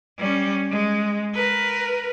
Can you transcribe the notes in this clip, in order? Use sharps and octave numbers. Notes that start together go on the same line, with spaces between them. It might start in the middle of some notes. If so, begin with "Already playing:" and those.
G3 C#4
G#3
A#4 B4